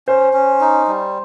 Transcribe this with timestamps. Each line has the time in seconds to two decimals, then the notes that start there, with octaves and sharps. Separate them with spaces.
0.08 C#4 C5
0.33 C#4
0.61 D#4
0.87 G3